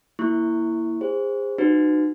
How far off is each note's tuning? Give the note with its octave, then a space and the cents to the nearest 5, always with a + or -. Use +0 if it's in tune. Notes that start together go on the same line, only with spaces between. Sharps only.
A#3 +0 E4 +0 C#6 +0
G#4 -35 C5 +0
D#4 -35 F#4 +0 B4 +35